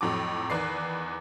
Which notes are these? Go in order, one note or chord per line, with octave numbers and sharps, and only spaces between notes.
F2 A2 F#3 D6
E2 D#3 B4 D5 C7